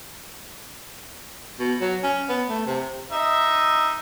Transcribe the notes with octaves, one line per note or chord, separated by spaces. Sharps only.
B2
F#3
C#4
B3
A3
C3
D#4 D#5 E5